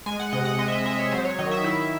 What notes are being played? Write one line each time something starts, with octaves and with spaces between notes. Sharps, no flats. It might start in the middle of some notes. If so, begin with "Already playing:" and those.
G#3 G#5
F#5
C3 D#5
F#5
G#3 D#5
E5
D#5
G#3 E5
C#5
F#3 C5
C#5
D#3 D#5
E5
E4